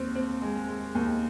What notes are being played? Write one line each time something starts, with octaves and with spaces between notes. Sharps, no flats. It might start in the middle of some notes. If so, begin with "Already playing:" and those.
Already playing: D#2 C4
C4
G#3
G#3
D#2